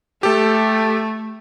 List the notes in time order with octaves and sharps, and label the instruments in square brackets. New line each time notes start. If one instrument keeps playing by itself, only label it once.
[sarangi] A3 [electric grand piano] G4 A4